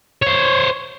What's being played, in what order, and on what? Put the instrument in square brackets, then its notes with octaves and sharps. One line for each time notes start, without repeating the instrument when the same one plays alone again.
[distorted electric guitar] C5 C#5